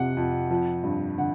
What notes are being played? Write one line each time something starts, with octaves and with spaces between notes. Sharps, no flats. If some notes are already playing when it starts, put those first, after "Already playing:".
Already playing: F2 C3 F#5
F2
F3
G2
D3 F#5